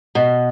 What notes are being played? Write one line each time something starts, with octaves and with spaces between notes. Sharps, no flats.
B2